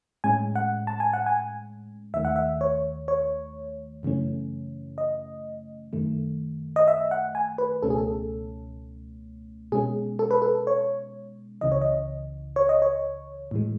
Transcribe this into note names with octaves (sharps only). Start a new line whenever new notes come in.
A2 G#3 C#4 G#5
F#5
A5
G#5
F#5
G#5
D#2 D#3 A3 E5
F#5
E5
C#5
C#5
F#2 C#3 E3 A3 C#4
D#5
F#2 D#3 A3
D#5
E5
F#5
G#5
B4
C#2 B2 A3 C#4 A4
G#4
A4
B2 G#3 C#4 G#4
A4
B4
A4
C#5
C#2 C#3 E3 D#5
C#5
D#5
C#5
D#5
C#5
A2 E3 G#3